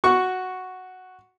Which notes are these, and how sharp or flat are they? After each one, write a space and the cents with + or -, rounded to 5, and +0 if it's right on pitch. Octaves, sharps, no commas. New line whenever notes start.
F#4 +0 C#6 +0